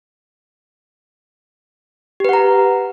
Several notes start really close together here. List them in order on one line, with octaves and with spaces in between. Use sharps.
G4 B4 F#5 A#5